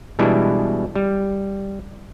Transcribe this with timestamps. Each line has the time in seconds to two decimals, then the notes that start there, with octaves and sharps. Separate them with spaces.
0.19 B2 E3 G3 G#3 D4 E4
0.95 G3